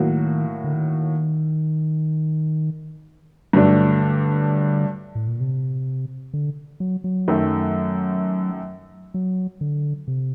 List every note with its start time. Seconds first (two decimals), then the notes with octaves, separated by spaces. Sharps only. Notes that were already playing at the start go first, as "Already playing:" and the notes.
Already playing: A2 D#3 F#3 A#3 F#4
0.64 D3
0.74 D#3
3.53 G2 D3 F#3 A3 D4
5.15 A2
5.27 A#2
5.40 C3
6.34 D3
6.80 F#3
7.04 F#3
7.28 F#2 D#3 A3
9.14 F#3
9.61 D3
10.08 C3